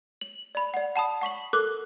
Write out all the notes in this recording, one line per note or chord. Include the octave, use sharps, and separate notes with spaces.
F#7
D5 B5
D5 F#5
F#5 A5 B5 D#6
F#5 C#6 B6 F#7
A4 A#4 D6 F#6